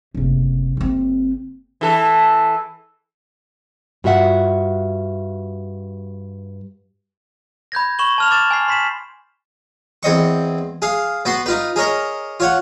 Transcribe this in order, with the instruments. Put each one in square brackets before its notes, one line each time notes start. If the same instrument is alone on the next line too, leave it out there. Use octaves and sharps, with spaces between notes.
[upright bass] F#1 C3
F#1 C4
[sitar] E3 A4
[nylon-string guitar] G2 F4 F#4 E5 F#5
[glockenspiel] B5 G6 G#6 A#6
B5 C#6 E7 F#7 G7
A5 F6 F7
D6 A6 E7
G#5 F6 C7
C6 B6 E7
[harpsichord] E2 C4 D#5 C#6
G#4 F5
B3 F#4 C6
D#4 F4 B4
G#4 A#4 C#5 D#5
F4 C#5 F#5